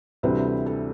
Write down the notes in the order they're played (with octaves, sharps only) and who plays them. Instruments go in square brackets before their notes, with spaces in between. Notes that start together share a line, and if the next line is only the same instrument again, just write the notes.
[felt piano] D2 C3 E3 G3 C4 B4
A4